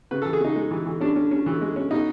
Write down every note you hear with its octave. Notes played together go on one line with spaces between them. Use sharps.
C#3 B4
A4
E3
G#4
C#3 D#4
G#3
E3
E3
C#4 D4
C#4
C#4
E3
G#3
C#4
B2 D#4